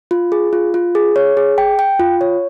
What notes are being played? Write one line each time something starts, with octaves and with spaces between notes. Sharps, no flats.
F4
G#4
F4
F4
G#4
C#5
G#4
G5
G5
F4
C#5